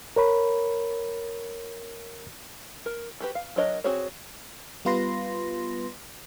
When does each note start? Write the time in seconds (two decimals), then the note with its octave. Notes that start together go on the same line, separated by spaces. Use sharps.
0.16 A#4 C#5 B5
2.86 A#4
3.20 F#4 G4 B4
3.35 F5
3.56 F#3 D4 A#4 C#5 D#5
3.84 C4 F#4 G#4 C5 C#5
4.85 G3 B3 F4 B4 C6 A#6